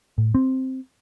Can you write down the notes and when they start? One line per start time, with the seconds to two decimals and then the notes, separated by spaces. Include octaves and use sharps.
0.18 A2
0.35 C4